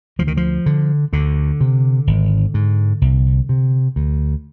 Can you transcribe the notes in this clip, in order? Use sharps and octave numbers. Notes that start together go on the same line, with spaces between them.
D2 F3
D#3
F3
D3
D2 D3
C3
G#1
G#2
C2
C3
D2